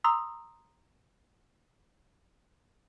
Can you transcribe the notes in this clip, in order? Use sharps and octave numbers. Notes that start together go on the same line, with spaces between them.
A#5 C6 D#6 E6